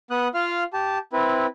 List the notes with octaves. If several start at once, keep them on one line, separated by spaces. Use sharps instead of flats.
B3 D#6 F#6
F4 F5 F6
G4 A5
C4 E4 B4